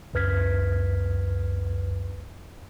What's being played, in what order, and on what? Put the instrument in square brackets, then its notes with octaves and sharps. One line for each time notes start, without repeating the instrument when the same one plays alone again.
[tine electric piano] C#2 F#2 B4 F6 G#6 B6